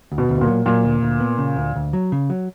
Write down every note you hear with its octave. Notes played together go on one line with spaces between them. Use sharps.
D2
B2
D2
B2
A#2
F#3
A#2 F#3
D2
D2
B3
C#3
D2
D2
F#3
C#3
F#3